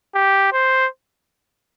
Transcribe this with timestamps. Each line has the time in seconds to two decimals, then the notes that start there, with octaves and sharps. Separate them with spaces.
0.15 G4
0.53 C5